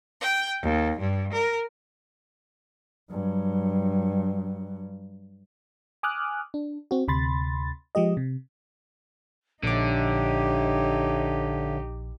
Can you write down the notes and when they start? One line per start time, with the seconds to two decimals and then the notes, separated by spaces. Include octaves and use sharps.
0.20 G5
0.62 D#2
0.99 G2
1.32 A#4
3.11 G2 F#3
6.03 G#5 D6 D#6 F6 F#6
6.54 D4
6.91 C4 F#4
7.08 D2 C3 B5 C6 A6
7.95 F3 G#3 G4 D#5
8.17 C3
9.63 A#1 D3 D#4 G4 C#5 D#5 E5 D6